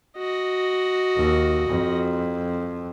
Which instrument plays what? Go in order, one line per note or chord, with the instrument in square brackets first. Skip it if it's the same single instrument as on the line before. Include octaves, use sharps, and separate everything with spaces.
[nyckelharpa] F#4 D#5
[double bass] D#2
F2